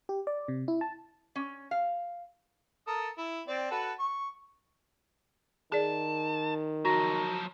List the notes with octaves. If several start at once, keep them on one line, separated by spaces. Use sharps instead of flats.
G4
D5
C3
E4
A5
C#4
F5
A4 A#4 D#6
E4
C4 D5
F#4 A4 B4
C#6
D#3 G#4 D5 A5
F3 F#3 F#4 A#5 A#6